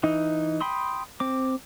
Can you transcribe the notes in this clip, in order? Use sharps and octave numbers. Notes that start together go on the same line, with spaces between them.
E3 D#4
G5 B5 C6 D#6
C4 D6